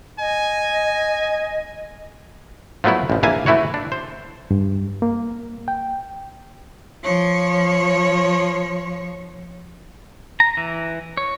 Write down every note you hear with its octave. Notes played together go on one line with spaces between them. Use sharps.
D#5 G#5
F3 F#3 A3 B3 E4
A1 F3
A#1 E3 A#3 E5 G#5 A5
E3 A3 E4 F#4 C#5
D4
C5
G2
A#3
G5
F3 C#5
A#5
E3
C#5